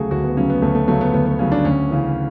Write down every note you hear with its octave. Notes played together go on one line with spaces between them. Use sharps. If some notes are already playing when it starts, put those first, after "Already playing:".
Already playing: D2 C#3 F#3 A3 F#4 G#4
D2 F#4
B3
C#3 F#3 C#4
B3
D2 A3
A3
C#3 F#3 A3
B3
D2 B3
B3
C#3 F#3 C#4
D4
D2 C#4
C#3 E3